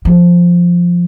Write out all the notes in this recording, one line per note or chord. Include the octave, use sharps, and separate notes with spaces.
F3